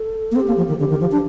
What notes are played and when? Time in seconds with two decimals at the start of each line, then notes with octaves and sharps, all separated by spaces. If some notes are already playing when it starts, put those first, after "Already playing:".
Already playing: A4
0.31 A#3
0.35 C4 A4
0.40 G4
0.47 A#3
0.57 F3
0.68 D#3
0.79 D3 G4
0.90 D#3
1.01 F3
1.11 D4